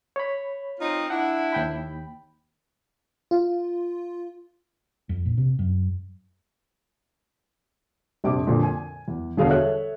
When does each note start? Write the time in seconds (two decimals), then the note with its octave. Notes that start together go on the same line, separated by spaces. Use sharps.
0.16 C#5 B5
0.80 C4 D#4 F4
1.10 D4 E4 F#5
1.52 D#2 G5 B5
3.31 F4
5.09 F2
5.25 A#1
5.37 C3
5.59 F#2
8.24 A#1 F2 C3 D6
8.47 F2 A#2 D3 F3
8.63 G#5
9.08 E2
9.37 E1 B2 D3 G#4 F5
9.49 A4 C#5 E5 F#6